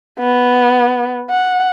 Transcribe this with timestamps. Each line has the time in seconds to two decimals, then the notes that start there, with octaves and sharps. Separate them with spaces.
0.19 B3
1.30 F#5